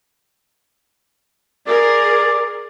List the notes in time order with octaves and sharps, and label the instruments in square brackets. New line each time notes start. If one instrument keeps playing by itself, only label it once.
[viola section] G#4 A#4 [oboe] D5